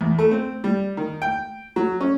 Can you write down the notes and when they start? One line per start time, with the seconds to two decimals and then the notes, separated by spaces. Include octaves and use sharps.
0.01 E2
0.19 A3
0.31 C4
0.64 G3
0.97 D#3
1.22 G5
1.76 F#3
2.00 C#4